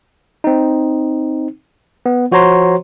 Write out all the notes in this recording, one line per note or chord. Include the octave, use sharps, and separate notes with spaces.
C4 D#4
B3
F3 F#4 C5 C#5 A#5 C6